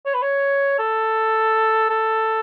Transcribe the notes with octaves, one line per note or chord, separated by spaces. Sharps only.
C#5
B4
C#5
A4
A4